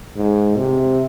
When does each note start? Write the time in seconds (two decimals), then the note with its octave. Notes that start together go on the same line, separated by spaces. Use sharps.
0.16 G#2
0.56 C3